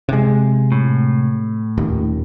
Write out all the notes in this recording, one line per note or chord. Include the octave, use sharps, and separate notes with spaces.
C3 G#3
A2
D#1 D#2